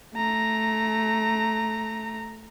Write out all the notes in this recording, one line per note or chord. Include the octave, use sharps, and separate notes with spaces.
A3 A#5